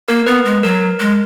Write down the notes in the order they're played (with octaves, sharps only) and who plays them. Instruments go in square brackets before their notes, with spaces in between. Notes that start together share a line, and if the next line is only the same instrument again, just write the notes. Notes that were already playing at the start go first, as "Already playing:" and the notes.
[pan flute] A#3 [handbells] A#4
[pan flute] B3 [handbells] B4
[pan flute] G#3
[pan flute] F#3 [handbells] A#4
[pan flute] G#3